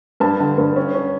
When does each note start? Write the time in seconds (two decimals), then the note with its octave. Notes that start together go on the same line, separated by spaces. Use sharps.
0.20 G2 A5
0.40 D3
0.58 G2
0.76 C#4
0.94 C#4